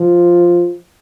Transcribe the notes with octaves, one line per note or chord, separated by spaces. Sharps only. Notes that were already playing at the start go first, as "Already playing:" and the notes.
Already playing: F3